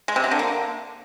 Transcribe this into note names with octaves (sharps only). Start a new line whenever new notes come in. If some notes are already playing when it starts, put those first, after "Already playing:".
G#3
C3
F#3
D3
A#3